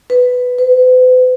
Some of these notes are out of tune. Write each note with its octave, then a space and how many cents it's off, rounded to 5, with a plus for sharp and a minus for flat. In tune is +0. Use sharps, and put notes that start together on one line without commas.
B4 +5
B4 +45